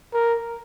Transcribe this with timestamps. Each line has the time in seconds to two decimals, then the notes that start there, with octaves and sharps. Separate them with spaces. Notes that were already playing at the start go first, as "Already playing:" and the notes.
0.13 A#4